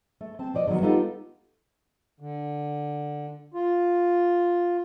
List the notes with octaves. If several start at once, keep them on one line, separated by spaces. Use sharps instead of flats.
A3
C4 A5
F3 C5 D5 D#5
D3 D#3 F3 F#3 B3
G#3 B3 D#4 F4 G4 A4
D3
F4